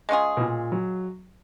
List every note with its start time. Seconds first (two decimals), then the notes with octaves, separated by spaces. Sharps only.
0.09 G#3 C#4 F4 G#4
0.37 B2
0.40 A#2
0.72 F#3